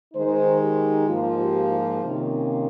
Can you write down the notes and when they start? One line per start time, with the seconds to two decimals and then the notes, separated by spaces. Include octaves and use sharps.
0.14 D#3 G#3 D#4 C5
0.60 G4
1.07 G#2 F3 A#3 F4
1.39 G4
1.70 F4
2.02 C3 D#3 A#3 C#4